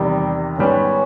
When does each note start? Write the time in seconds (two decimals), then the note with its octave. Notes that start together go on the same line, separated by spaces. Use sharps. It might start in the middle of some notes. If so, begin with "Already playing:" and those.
Already playing: E2 C3 D#3 G3
0.58 G#2 D#3 G3 B3 C#4